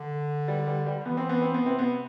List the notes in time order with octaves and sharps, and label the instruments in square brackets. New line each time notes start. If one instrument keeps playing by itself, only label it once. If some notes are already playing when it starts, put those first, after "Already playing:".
Already playing: [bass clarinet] D3
[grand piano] G3
G3
G3
[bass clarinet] D3
[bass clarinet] E3 [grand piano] B3
[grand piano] C4
B3
C4
B3
[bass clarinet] C3 [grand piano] C4
[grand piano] B3